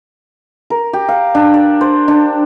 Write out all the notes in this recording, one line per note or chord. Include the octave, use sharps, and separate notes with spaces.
A#4
G4
F5
D4
D5
C5
D4